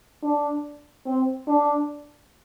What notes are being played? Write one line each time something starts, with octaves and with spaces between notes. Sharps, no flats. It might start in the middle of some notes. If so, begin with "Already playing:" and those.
D4
C4
D4